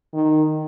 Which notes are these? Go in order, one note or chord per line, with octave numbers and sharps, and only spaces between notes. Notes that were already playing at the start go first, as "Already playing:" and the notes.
D#3